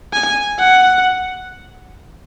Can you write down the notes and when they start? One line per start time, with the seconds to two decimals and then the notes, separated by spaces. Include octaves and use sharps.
0.13 G#5
0.59 F#5